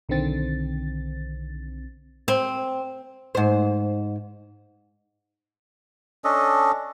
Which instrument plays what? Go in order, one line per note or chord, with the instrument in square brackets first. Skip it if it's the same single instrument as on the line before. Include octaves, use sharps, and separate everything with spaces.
[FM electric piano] B1 D3 D#3 C4 A6
[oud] C4
G#2 C5
[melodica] C#4 D4 A4 D#5